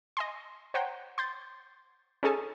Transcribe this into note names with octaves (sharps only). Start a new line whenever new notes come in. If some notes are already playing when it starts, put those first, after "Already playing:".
D#5 G#5 C6
C5 C#5 F#5 G5 A#5 C6
C6 G6 A6
C#4 D#4 G#4 A4 G#5 A5